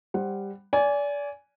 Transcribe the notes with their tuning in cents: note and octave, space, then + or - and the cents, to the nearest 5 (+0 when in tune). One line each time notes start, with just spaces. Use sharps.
G3 +15 C5 +20 F#5 +10
D5 -30 G#5 +0